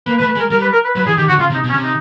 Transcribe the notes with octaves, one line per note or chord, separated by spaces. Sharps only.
A#3 B4
B4
A3
B4
G#3
A#4
G3 A#4
B4
A#4
B4
F#3 B4
E3 G#4
D#3 G4
D3 F#4
C#3 F4
C3
D#4
B2
C#4
C3
D#4